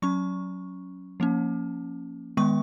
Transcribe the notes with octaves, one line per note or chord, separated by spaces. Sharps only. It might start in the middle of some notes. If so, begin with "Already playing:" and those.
F#3 C#4 C#6
F3 A#3 C#4
D#3 G#3 B3 C#6